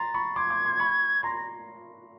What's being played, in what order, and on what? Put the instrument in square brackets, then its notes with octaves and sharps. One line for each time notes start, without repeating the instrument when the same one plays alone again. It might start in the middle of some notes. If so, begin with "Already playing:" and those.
Already playing: [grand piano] A#5 C6 [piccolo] A6
[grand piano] B5 C#6
[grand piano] C6 D6 [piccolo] G#6
[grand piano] C6 D6
C6 D6
B5 C#6
[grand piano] A#5 C6 [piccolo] A#6
[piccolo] A#6